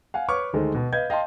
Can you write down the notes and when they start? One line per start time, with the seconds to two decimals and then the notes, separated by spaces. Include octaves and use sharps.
0.14 F5 F#5 G#5
0.28 B4 C#5 C#6 D6 F6
0.53 D2 D#3 G#3 A4 C5
0.74 B2
0.93 B4 D#5 F5 G6 G#6
1.10 D#5 F5 G5 A5 C6